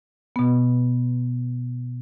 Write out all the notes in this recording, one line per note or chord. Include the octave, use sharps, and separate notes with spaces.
B2 B3